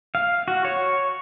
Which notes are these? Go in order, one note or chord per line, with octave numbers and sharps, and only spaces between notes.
F5
F#4
C#5